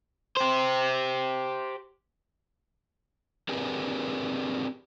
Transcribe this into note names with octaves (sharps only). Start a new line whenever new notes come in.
G4 C5
C4 D4 G4 G#4 A#4 B4